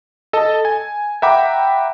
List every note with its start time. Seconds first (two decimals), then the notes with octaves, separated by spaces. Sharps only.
0.33 A4 D#5 A5
0.65 G#5
1.22 E5 F#5 G5 A#5 B5 D6